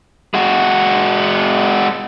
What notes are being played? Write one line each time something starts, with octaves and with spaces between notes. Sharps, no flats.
G#3 F#4